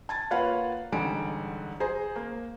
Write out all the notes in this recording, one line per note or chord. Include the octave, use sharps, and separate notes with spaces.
A5 G#6 A6
A#3 F4 B4 C#5 F5 F#5
A1 G#2 D3 G3 G#5 D7
G#4 C5 A#5
A#3